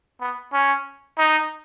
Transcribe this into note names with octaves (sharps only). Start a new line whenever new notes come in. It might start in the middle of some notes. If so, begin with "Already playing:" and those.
B3
C#4
D#4